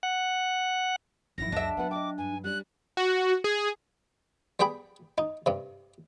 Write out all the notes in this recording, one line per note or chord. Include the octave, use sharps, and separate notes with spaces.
F#5
G1 F#2 D#3 F3 E4 A#6
C#2 F#2 D4 G#4 D#5 E5
F#3 B3 B4 F#5
D#5 G5 D6
G2 G#5
G3 C#4 D4 F#6
F#4
G#4
G3 B3 G#4 G5 B5
D#4
G2 C3